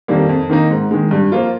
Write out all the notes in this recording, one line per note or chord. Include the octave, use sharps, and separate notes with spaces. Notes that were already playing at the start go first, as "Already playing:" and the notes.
F2 D#3 G3 A#3
F2
D#3 A#3 D#4
G#2
D#3 G#3
G2
F3 A#3 F4